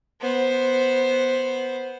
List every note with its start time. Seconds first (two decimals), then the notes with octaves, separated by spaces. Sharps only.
0.22 B3 C5